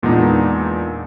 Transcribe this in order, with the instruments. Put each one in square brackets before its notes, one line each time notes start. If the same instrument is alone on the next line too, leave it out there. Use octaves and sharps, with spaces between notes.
[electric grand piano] E2 A#2 G#3 B3 D4 D#4